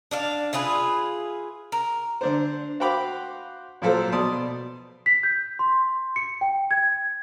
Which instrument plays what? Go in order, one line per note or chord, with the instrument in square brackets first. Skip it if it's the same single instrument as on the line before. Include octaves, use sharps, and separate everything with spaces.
[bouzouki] D4 D5 F5
E4 F4 G#4 B4
A#4
[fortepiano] D3 D4 C5
F#4 C5 F5 G5 B5 D6
A#2 F3 F#3 A4 C5
B2 D5 A5 C6 D#6
[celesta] B6
G6
C6
C#7
G5
G#6